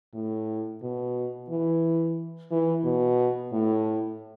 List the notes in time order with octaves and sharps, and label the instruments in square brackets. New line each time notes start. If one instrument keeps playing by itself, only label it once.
[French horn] A2
B2
E3
E3
B2
A2